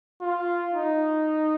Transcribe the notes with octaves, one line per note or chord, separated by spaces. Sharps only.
F4
D#4